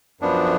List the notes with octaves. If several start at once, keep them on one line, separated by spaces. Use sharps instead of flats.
F#2 F3 B3 D4